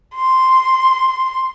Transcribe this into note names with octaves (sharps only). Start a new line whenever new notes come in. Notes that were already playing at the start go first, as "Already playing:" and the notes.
C6